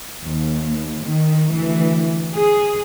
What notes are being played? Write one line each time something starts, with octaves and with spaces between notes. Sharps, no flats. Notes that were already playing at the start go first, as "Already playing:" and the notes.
D#2
D#3
D2 E3
G#4